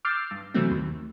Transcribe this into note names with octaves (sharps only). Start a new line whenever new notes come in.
D6 E6 F6 G6 A6 C7
G2
C3 E3 F#3 A3 C4
D#2